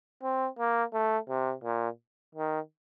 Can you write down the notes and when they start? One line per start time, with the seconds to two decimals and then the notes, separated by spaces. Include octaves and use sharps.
0.23 C4
0.59 A#3
0.94 A3
1.29 C3
1.64 A#2
2.35 D#3